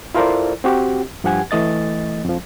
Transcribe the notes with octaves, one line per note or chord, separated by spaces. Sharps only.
E4 F4 A4 A#4 C5 D5
C4 F#4 G4
G2 F3 G4 F#5 G#5 G#6
E3 A3 D#5 A6
F2 F3